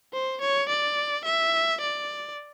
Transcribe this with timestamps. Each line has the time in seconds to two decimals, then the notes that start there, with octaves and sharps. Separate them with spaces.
0.13 C5
0.41 C#5
0.69 D5
1.25 E5
1.81 D5